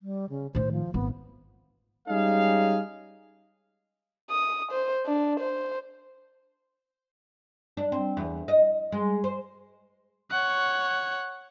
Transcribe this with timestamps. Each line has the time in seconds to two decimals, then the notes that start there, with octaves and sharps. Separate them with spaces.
0.01 G3
0.30 C#3
0.55 A2 D#3 C5
0.72 F3
0.94 G#1 B3
2.08 G3 G#3 C#4 D#4 G#4 F5
4.30 D#6
4.72 C5
5.06 D4
5.40 C5
7.77 D4
7.92 C4
8.17 E2
8.48 D#5
8.92 G#3
9.24 C5
10.30 C#5 F#5